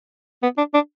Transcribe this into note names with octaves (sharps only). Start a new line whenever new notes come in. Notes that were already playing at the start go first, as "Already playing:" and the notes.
B3
D4
D4